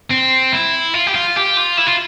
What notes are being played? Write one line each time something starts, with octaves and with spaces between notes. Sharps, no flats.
C4
E4
F4
G4
F4
G4
F4
E4
F4